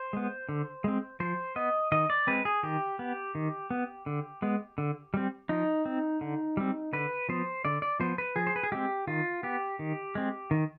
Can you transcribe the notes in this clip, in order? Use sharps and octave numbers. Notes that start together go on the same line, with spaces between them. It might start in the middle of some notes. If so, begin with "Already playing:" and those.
Already playing: C5
G#3 B3
D3
G#3 C4
F3 C5
B3 D#5
D#3 D#5
D5
G#3 C4 B4
G#4
D#3 G4
B3
D#3
B3
D3
G#3 B3
D3
G3 C4
F3 D#4
C4
D3
G3 C4
D3 B4
F3 B3 C5
D3 D5
D5
F3 B3 C5
B4
F3 G#4
C5
B4
G#4
G#3 C4 G4
D#3 F4
B3 G4
D#3
G#3 C4
D#3